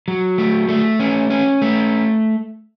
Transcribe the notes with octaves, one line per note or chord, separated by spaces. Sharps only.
F#3
A3
A3
C#4
C#4
A3